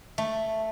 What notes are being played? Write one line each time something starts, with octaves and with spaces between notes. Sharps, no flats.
A3